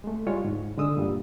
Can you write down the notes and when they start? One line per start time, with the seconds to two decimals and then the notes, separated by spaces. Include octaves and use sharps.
0.04 G#3 A3
0.26 G3 G#3 E4 F4 C#5
0.45 G#2
0.78 D3 G#3 D#6 E6
0.97 G2 A#2 G3